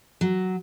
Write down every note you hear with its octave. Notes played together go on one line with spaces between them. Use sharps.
F#3